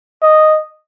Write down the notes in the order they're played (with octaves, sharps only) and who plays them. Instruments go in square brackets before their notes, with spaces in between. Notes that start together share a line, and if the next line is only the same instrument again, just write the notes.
[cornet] D#5